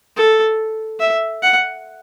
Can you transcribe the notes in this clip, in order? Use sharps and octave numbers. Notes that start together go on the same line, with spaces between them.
A4
E5
F#5